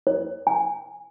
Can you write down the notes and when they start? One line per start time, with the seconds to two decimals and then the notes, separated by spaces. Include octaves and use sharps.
0.07 C#5
0.47 G#5